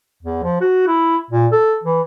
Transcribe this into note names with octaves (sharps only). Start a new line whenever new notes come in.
E2
F3
F#4
E4
A#2
A4
E3